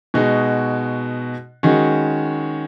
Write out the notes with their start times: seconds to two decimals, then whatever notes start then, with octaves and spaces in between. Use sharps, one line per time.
0.14 B2 G#3 D#4 F#4
1.63 D#3 G#3 C#4 F#4